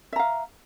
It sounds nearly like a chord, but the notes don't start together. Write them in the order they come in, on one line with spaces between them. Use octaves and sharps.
E5 A#5 F5